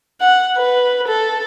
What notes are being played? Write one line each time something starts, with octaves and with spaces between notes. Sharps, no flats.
F#5
B4
A4